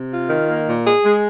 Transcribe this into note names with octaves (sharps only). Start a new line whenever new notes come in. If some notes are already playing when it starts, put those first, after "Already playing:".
Already playing: C3
F4
D#3
A#3
A#2
G#4
G#3